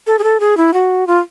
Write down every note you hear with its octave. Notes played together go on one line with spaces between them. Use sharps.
A4
G#4
A4
G#4
E4
F#4
F4